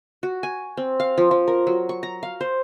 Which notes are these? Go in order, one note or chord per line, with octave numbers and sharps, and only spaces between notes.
F#4
G#5
C4
F5
F3
F3
A#4
F#3
C#6
A#5
F5
C5